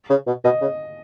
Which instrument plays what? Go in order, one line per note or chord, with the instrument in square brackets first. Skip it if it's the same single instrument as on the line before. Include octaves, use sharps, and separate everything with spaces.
[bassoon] C#3
B2
[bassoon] B2 [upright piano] D#5
[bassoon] C#3